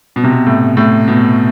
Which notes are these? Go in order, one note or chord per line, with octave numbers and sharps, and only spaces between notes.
B2
C3
B2
A2
A2
B2